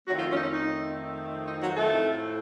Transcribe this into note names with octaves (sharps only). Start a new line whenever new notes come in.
F2 D#3 F#3 A3 C4 F#4
F3 F4
C#4
D#4
C#4
D#4
D#4
F#3 F#4
A3 A4
A2 F3 C4